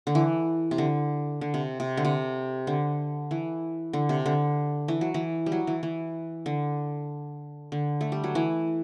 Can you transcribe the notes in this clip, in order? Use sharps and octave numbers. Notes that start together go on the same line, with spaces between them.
D3
E3
C3
D3
D3
C3
C3
D3
C3
D3
E3
D3
C3
D3
E3
F#3
E3
G3
F#3
E3
E3
D3
D3
A3
G3
F#3
E3